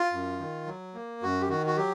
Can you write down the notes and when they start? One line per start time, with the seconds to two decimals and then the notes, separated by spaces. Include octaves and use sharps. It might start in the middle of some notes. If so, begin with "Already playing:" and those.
Already playing: F4
0.13 F#2
0.40 D#3
0.67 F#3
0.95 A#3
1.23 F#2 F#4
1.41 G4
1.49 D#3 F#4
1.66 F#4
1.76 F#3 G4